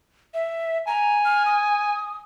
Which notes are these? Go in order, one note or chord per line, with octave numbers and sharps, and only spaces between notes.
E5
G#5 A#5
F6
D#6